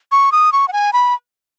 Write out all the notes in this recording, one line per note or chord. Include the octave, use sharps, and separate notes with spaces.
C#6
D#6
C#6
F#5
G#5
B5